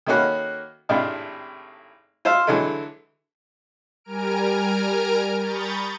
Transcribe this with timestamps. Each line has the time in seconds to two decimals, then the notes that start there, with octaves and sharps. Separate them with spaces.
0.07 D#3 A3 A#3 C#4 F#4 B4
0.89 G#1 A2 C3 D4 F5
2.25 F4 C5 E5 F5
2.47 D3 E3 F#3 G#3 A3
4.04 G3 A#4 G#5 A#5 F6 D7
5.39 A#5 B5 C#6 D#6 G6 A6